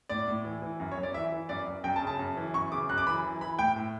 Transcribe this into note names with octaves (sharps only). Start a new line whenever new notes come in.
A2 D5
A2
E3
E3
F#2
C#5
F#2
D5
E3 E5
E3
F#2 D5
F#2
F#2 G5
A5
C#3
A5
F#2
E3
F#2 C#6
C#3 D6
F#2 F#6
D6
E3 B5
E3
E3 B5
A2 G5
A2